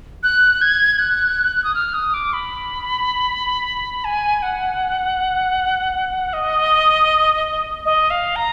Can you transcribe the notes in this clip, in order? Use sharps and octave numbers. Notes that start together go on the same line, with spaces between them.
F#6
G#6
F#6
D#6
F6
D#6
D6
B5
G#5
F#5
D#5
D#5
F5
A#5